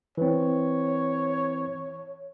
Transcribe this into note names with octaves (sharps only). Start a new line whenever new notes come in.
E3 C4 C#5